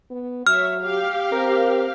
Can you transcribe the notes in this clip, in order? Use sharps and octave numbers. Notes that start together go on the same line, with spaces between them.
B3
F#3 C#5 E5 F6
G4 F5
C4 A#4